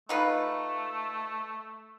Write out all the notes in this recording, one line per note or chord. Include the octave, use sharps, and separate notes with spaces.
A3 D#4 F4 B4